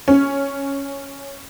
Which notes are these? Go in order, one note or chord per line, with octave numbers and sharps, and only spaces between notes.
C#4